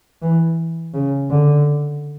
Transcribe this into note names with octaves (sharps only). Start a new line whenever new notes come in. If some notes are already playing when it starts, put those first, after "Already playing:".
E3
C#3
D3